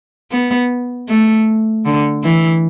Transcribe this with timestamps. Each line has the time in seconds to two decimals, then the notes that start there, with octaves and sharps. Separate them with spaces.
0.32 B3
1.09 A3
1.85 D3
2.24 E3